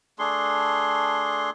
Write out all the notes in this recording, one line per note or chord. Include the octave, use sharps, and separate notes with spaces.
A3 D4 G#4 C6